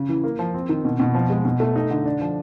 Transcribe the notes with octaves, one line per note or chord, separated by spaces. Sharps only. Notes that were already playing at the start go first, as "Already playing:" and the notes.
Already playing: C#3
E3
A#3
F3
C4
D#3
B2
B2
F3
G#3
B2
A3
D#4
D3
D4
F3